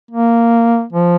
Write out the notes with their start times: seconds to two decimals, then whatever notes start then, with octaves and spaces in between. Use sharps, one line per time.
0.11 A#3
0.93 F3